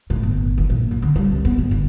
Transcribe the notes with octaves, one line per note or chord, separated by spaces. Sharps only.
A2
G1
E3
A#1
G2
D3
G3
C2
B3
G#2
G1